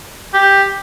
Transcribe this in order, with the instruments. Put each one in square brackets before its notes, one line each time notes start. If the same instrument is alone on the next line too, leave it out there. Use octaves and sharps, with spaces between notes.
[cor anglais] G4